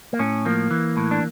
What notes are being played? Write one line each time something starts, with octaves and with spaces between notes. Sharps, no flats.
A#3
A2 C#4
F3 A#3
E3
A2
D4